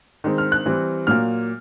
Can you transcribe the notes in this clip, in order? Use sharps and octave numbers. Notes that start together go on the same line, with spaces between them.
D#3 G#3 C4
F6
F#6
E3 G3 C4
A#2 F#3 A#3 F6